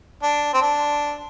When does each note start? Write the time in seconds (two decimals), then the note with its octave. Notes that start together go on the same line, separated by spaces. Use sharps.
0.23 D4
0.53 C4
0.61 D4